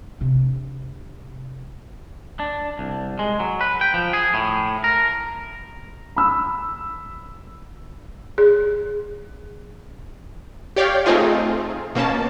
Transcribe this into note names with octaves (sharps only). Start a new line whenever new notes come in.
C3 D4
D4
C2
G#3
F#3
B4
G5
F3
G#4
A2
A#4
B5 E6
G#4
G4 C#5 D5 F5 G5
A3 C4 D#4 F4 G#4
B2 A#3 C#4 A5